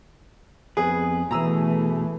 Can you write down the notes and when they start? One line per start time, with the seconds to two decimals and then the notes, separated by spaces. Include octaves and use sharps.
0.77 F2 B3 G#4 B4
1.31 B2 E3 A3 G#4 A#5 E6